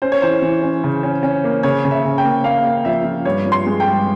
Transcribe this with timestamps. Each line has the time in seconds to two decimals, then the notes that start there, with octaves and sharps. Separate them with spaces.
0.02 C#4 C5
0.12 C#5
0.22 E3 C5
0.42 E3
0.62 C#4
0.84 C#3
1.03 C#4
1.23 C#4
1.44 A#3
1.63 C#3 C#5
1.85 C#3
1.91 E5
2.05 C#3
2.18 G5
2.24 A#3
2.44 A#3 F5
2.65 A#3
2.85 F3 E5
3.05 F3
3.25 G2 C#5
3.46 F3
3.52 C6
3.66 G#3
3.80 G5
3.87 G2